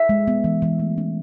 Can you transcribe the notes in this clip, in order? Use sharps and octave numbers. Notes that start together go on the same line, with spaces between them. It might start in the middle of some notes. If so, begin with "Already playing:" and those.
Already playing: E5
G#3
B3
E3
E3
A3
C#4